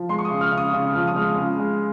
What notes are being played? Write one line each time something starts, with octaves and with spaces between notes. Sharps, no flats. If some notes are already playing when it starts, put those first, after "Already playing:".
Already playing: F3
G#3 C6
C#6
D#6
C#3
F6
C#3
D#6
C#3 D#6
F3 F6
D#6
G#3 F6
C#3
G#3